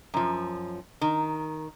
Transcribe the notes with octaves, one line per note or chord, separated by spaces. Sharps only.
F#2 F3
D#3